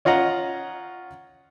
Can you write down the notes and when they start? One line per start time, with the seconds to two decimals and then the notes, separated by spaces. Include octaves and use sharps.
0.05 C#4 F4 D#5 F#5 A#5